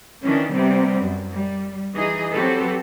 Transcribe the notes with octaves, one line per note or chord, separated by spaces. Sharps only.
D#3 E3 C#4 D4
C3 G3 B3 C4
F#2
G3
E3 D#4 G#4 D#5
F#3 C4 F#4 G4 A4 B4